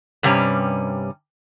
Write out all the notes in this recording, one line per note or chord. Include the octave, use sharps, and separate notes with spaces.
G2 C3 G3 C#4